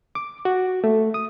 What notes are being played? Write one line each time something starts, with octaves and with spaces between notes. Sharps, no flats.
D6
F#4
A3
D#6